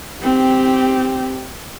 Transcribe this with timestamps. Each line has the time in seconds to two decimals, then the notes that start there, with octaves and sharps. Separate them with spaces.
0.23 C4 G4